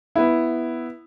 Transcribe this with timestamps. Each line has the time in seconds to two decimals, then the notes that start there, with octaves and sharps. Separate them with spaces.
0.16 B3 E4